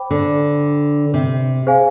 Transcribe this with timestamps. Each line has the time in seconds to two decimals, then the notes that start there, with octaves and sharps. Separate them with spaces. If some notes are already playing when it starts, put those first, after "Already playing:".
Already playing: C5 G5 B5 D6
0.11 D3
1.14 C3
1.67 G#4 C5 F5 G#5